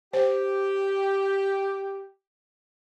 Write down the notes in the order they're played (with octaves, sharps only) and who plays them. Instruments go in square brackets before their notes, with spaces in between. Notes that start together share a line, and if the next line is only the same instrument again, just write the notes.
[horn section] G4 [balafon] C5